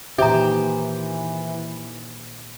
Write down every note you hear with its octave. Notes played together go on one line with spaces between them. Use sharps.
A#2 D#3 E3 G4 C5 E5 A#5